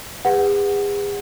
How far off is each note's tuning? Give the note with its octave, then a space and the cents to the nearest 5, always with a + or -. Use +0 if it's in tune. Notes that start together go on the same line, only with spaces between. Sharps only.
G#4 -40 B4 +0 F#5 +0